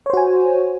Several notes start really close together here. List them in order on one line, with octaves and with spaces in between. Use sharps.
C#5 C5 F#4 G#5